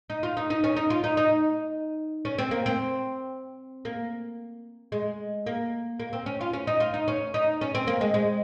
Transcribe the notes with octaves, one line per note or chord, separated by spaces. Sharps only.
D#4
F4
D#4
D#4
C#4
D#4
F4
D#4
D#4
C#4
C4
A#3
C4
A#3
G#3
A#3
A#3
C4
C#4
F4
C#4
D#4
F4
D#4
C#4
D#4
C#4
C4
A#3
G#3
G#3